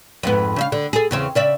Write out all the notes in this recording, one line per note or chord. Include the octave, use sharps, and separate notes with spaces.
F2 G#2 B3
C#3 E5 F5
D3
G#4 A4
E2 C#3 C4
C#3 D5 E5